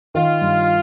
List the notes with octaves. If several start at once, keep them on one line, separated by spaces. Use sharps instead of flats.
D#3 F4
G2